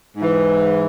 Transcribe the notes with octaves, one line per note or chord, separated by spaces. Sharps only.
G#2 E3